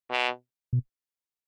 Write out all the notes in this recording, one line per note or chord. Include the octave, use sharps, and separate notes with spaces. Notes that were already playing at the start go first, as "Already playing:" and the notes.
B2
B2